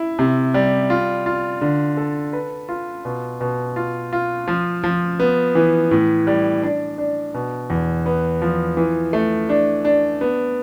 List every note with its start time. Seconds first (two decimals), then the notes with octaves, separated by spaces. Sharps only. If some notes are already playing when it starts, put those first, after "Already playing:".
Already playing: E4
0.19 C3
0.54 G3
0.90 F4
1.26 F4
1.61 D3
1.97 A4
2.33 B4
2.69 F4
3.05 B2
3.41 B2
3.76 F4
4.13 F4
4.48 F3
4.83 F3
5.20 B3
5.55 E3
5.91 A2
6.27 G3
6.63 D4
6.98 D4
7.34 B2
7.70 E2
8.06 B3
8.42 F3
8.77 E3
9.13 A3
9.49 D4
9.85 D4
10.21 B3